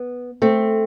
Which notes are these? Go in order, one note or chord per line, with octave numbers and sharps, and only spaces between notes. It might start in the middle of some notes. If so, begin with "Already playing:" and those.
Already playing: B3
A3 C4